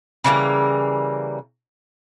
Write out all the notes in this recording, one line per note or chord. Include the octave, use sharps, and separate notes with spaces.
C#3 E3 G3 A#3